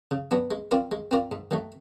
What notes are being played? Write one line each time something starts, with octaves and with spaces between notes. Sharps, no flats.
C#3
F#3 B3 D4
G#3
C4 F4 A#4 D5
G#3
C4 F4 A#4 D5
G#2
D#3 F#3 A3